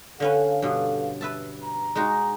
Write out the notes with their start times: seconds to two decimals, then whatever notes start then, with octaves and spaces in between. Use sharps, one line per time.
0.20 D3 C#4 A4 B4 F5
0.62 G2 B2
1.21 B4 E5 A5
1.63 A#5
1.95 G#3 D#4 F#4